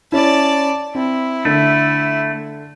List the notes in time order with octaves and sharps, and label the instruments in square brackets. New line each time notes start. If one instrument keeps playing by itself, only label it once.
[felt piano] C#4 E4 [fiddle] D5 A5
[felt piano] C4 [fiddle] E4
[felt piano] D3 [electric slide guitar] A3